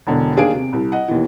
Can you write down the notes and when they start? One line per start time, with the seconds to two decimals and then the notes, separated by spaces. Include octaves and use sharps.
0.07 E1 B2 D3
0.36 D#2 D4 G#4 F5 D7
0.54 C3
0.73 C2
0.92 D#5 F#5
1.08 D#2 B2 E3